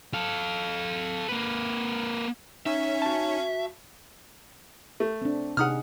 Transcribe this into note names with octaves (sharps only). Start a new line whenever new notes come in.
A4 F5
A#3 B4
C#4 D#4 E5
F#4 A5
A3
C4 D4
C3 D#4 G#4 F#5 D#6 F6